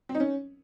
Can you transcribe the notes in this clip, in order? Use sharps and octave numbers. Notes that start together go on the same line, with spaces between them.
C4
D#4
C#4